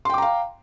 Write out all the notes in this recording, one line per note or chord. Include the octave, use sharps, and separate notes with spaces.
F5 G5 A#5 C6 D6